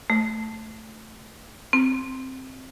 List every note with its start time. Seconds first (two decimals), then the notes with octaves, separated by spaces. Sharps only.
0.10 A3
1.73 C4